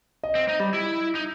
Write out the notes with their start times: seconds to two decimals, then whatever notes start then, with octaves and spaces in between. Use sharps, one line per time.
0.24 D#5
0.35 C4
0.48 D#4
0.60 G3
0.73 E4
1.15 D#4